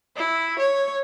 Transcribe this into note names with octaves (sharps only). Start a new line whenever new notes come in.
E4
C#5